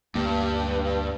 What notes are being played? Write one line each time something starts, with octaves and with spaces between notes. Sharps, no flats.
D2 G2 A#3